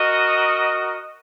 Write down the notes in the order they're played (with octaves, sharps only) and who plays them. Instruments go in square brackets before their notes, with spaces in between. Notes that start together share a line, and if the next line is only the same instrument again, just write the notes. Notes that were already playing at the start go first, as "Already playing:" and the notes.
Already playing: [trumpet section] F#4 A#4 D#5